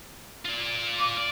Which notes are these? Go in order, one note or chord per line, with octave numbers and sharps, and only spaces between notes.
F4 D5
D6
D5